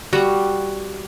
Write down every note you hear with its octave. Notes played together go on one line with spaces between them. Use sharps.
G3 F#4